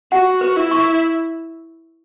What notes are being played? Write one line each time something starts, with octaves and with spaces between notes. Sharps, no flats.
F#4 F#5
B4
E4
C#6